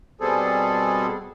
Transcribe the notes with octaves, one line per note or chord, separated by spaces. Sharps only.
B2 G3 C4 G#4 A4